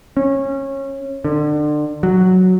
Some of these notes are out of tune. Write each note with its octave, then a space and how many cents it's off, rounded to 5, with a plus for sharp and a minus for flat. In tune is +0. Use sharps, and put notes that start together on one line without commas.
C#4 -25
D3 +30
F#3 +0